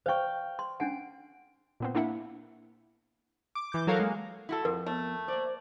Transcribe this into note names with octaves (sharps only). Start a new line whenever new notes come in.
C5 F5 G5 C#6
C6
C#4 D4 F#5 D7
A#2 B3 C4
A#3 D4 E4 E5 F#5
D6
E3 D6 G6
F#3 F#4 A4 A#4 C#5 F5
G#3 A#3
E4 F#4 A4
F2 A#4
A3 B3
A#3 C5 D5